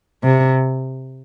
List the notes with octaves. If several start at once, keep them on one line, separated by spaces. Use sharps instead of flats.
C3